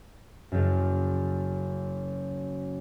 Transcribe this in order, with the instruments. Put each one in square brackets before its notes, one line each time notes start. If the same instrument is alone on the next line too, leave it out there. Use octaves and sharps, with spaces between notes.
[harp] F#1 F#2